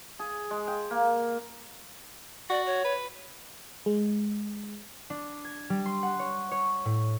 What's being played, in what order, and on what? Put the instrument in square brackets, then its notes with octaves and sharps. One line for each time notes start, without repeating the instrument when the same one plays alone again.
[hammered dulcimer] G#4
G#3
G5
A#3
[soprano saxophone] F#4 [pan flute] D5
[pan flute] C#5
[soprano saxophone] B4
[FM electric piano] G#3
[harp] D4
G#6
G3
C6
F#5
C#5
C#5
A2